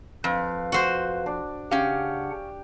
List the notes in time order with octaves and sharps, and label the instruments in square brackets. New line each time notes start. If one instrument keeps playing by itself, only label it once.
[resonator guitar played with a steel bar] F2 [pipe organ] B4 F5
[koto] F#4 C5
[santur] D4
[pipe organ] C#3 D4 F#5 [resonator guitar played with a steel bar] C#4 F5 [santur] G4